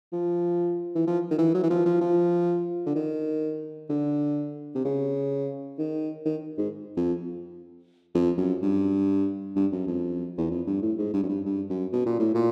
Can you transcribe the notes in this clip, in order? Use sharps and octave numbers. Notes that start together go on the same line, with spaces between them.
F3
E3
F3
D#3
E3
F#3
E3
F3
F3
F3
D3
D#3
D3
C3
C#3
D#3
D#3
G#2
F2
F2
F#2
G2
G2
F#2
F2
E2
F2
G2
A2
G#2
G2
F#2
G2
G2
F#2
B2
A#2
A2
A#2